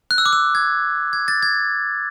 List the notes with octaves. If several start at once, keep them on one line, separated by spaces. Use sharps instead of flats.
F#6
E6
D6
E6
G#6
G#6
A6
G#6